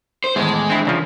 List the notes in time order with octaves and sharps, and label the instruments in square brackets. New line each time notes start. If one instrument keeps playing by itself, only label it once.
[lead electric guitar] C5
[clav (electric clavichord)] E2 A2 [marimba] D#3 E3 A5 [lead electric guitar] G#3
[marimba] D6
[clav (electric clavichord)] C4 E4 [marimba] D4
[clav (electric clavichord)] C2 C#3 F3 [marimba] E3